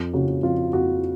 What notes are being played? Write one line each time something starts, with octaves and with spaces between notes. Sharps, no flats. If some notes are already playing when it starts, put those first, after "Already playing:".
Already playing: F2
C#3 F#4
F2 F4
F2 F#4